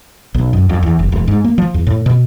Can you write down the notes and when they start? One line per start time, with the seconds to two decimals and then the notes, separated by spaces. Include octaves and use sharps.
0.34 B1
0.53 F#2
0.69 F2
0.83 E2
0.99 F#1
1.12 E1
1.28 G#2
1.44 A#3
1.58 F3
1.74 E2
1.87 A2
2.06 B2